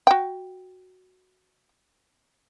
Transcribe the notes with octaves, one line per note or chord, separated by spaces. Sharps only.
F#4 G5